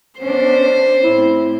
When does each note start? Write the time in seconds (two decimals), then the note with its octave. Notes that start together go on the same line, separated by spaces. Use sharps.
0.20 B3 C#4 D4 C5
1.03 A2 C4 E4